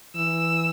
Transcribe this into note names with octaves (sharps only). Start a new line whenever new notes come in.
E3 E6